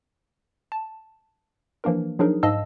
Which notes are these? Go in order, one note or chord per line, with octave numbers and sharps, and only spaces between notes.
A5
E3 F3 A#3 D4 A#4
F3 F#3 D4 D#4 G#4 A#4
G#2 D#5 F5 A5 E6